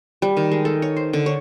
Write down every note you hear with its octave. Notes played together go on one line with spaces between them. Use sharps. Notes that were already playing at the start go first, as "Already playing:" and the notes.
G3
D#3
G#3
A4
C#5
C5
D3
C#5